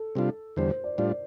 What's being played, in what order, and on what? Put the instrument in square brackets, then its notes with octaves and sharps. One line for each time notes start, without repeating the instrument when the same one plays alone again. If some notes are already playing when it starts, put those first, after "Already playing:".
Already playing: [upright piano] A4
[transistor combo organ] C3 G3 D4 F4
[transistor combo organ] E2 D3 G3 [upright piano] C5
[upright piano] C5
D5
[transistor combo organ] A2 G3 D4 F4 [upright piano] D5